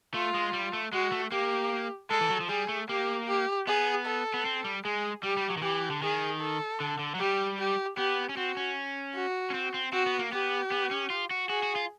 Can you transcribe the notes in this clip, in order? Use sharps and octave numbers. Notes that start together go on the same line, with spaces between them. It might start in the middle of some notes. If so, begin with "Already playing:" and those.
A3 F4
G#3
G3
A3
G#3 F#4
A3
A#3 G4
G#3 A4
E3
F#3
F3
G3 G#4
A3
A#3 G4
G4
B3 G#4
A4
B3
C4
G3
G#3 G#4
G3 G4
G3
F#3
D#3
E3 G4
D3
D#3 G#4
A4
D3
D3
F#3
G3 G4
G4
B3 G4
C#4
C4 F#4
C#4
F#4
C#4
C4
C4
C4 F#4
B3
A#3
B3 G4
B3
C#4
F4
F#4
F#4 G#4
F#4
F4